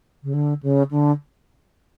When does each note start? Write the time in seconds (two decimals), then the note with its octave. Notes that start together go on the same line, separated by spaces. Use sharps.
0.23 C#3
0.33 D3
0.62 C#3
0.90 D3